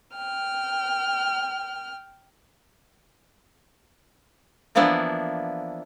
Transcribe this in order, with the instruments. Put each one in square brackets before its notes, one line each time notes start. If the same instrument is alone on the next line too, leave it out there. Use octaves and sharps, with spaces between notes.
[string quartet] G5 F6
[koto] E3 F3 A#3 B3 D4 E4